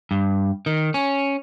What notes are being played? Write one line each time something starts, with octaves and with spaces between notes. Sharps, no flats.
G2
D#3
C#4